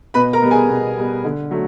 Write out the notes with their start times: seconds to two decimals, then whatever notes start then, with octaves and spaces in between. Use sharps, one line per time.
0.14 B2 B4 B5
0.33 A#4 A#5
0.42 G3 B3
0.51 G#4 G#5
0.70 B2
0.97 G3 B3
1.25 D3
1.51 F#3 A3